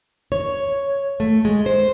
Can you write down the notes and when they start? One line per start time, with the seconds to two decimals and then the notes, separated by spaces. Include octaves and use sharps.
0.32 C#5
1.20 A3
1.45 G#3
1.66 C5